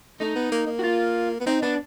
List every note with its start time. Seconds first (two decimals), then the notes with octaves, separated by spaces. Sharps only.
0.20 A3 D#4
0.35 B3
0.52 A#3
0.67 A#3
0.79 F#4
0.83 F4
1.40 B3
1.46 C4 D#4
1.62 B3 D4